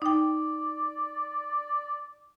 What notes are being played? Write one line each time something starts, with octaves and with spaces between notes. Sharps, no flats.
D#4 D5 G5